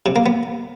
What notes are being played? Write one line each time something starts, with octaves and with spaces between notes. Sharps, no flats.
C3
A#3
B3